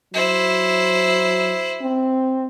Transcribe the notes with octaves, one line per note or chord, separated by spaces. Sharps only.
F#3 E4 C5
C4